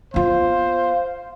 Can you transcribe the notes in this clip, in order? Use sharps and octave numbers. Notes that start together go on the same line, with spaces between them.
B3 F4 C5 F5